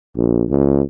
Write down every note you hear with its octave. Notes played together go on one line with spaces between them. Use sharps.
A#1
C#2